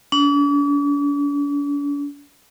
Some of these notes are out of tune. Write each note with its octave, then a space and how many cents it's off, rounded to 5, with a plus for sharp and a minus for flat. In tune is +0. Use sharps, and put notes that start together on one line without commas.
D4 -45